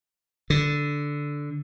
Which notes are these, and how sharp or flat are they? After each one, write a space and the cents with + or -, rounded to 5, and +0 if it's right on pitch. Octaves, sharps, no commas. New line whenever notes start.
D3 -5